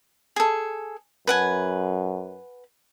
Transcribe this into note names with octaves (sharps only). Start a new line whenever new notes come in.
G#4 A4
F#2 B4 F#5 G#5